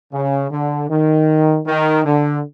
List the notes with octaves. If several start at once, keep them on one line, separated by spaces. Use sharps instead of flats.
C#3
D3
D#3
D#3
D3